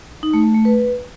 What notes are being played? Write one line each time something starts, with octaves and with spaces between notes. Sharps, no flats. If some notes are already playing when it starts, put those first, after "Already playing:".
D#4
A3
A3
A3
B4